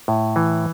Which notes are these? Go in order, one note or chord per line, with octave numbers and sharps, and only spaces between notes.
A2
E3